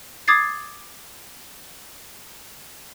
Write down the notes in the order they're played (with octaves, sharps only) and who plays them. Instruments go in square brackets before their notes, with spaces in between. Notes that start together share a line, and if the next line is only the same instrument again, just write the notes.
[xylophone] D6 D#6 G#6 A6 C7